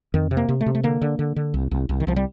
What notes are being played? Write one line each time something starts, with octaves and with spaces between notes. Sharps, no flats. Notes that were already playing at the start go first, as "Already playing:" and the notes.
F2 D#3
C3
A#3
C3
A3
C3
A3
D3 A#3
D3
D3
D3
C2
C2
C2
D#3
C2 F3
G3